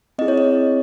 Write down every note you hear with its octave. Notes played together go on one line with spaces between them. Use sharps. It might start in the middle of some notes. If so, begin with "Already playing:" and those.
C4 E4 G#4 D#5
C#5
D#5